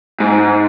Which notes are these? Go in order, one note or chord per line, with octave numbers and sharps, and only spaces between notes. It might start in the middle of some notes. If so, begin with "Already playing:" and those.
G#2